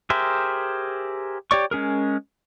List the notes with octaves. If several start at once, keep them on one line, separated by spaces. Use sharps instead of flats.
G4 G#4 A#4 C5 E5
G4 C#5 D5 C#6
G#3 C#4 G#4 A#4